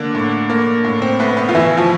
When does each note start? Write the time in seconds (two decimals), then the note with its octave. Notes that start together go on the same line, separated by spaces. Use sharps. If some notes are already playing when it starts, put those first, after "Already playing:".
Already playing: D3 A#3 D4
0.15 A2
0.50 A#3
0.85 A2
1.02 C4
1.19 A3 B3
1.37 B3
1.49 F4
1.55 B2 E3 E4
1.77 F3 F4